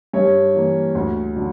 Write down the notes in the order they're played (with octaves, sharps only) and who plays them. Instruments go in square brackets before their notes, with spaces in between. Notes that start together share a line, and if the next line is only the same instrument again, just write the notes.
[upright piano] G2 C#5
E3 A#3
D2
D3 F#3